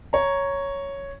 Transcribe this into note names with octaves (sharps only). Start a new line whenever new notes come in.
C#5 A#5